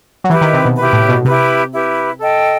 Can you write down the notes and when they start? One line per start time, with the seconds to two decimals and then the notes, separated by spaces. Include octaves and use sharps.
0.24 F#3
0.29 E3 E4 G4 B4
0.41 D#3
0.53 C3
0.65 B2
0.77 E4 G4 B4
0.93 A2
1.09 B2
1.24 C3 E4 G4 B4
1.72 E4 G4 B4
2.19 A4 D#5 G5